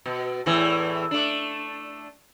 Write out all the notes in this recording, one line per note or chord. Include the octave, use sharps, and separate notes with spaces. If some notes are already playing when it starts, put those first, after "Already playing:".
B2
E2 A2 E3
A3 D4